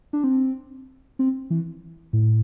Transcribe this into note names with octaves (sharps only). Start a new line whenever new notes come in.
D4
C4
C4
E3
A2